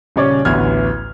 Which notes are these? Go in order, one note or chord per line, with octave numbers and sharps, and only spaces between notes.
D#1 C#3 C#4 C#5 D5
A1 D2 E3 B3 F6 G#6